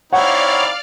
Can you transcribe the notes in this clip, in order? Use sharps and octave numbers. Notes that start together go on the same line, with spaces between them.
C4 D#4 E4 C#5 D5 F5 F#5 F6